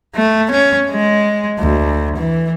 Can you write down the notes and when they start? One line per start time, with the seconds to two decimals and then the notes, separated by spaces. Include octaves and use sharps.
0.15 A3
0.51 C#4
0.90 G#3
1.59 D2
2.16 E3